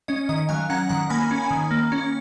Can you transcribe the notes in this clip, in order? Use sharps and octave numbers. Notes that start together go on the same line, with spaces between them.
C#4 D#5
D#3 D#5
F#3 F5 G#5
C#4 F#5 A#5
D#3 F#5 A#5
A#3 G#5 B5
C#4
D#3
A#3
C#4